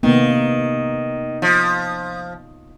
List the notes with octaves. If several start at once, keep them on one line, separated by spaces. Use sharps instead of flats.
C3 D#3 A#3 B3
F3